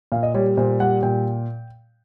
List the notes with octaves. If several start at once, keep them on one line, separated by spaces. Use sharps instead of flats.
A#2 F5
D#5
G3 C#5
A#2 C5
G3 F#5
A#2 G5